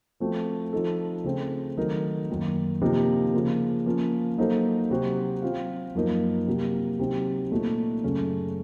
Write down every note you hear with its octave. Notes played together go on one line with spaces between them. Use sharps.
F3 A3 C4 F#4
F3 C4 D#4 A4
C#3 A3 C4
D#3 F#3 A3 D#4 A#4
F#2 D#3 A#3
C3 F3 A#3 D#4
C#3 F3 A#3
F3 A#3 C#4
F#3 A#3 D#4 A4 C5
C3 F#3 C4 F#4 C5
F#3 C4 F4
F#2 F3 A#3 D#4 A#4
C3 F#3 A#3
C3 F#3 C4 D#4
A#2 A3 D#4 F#4
F#2 C#3 A3 C#4